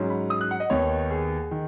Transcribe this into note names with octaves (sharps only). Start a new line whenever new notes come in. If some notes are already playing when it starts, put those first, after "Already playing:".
Already playing: G#2 F#3 C#4
B5
D#6
F#6
F#5
D#5
D#2 D#3 B3 C#5
G#4
D#3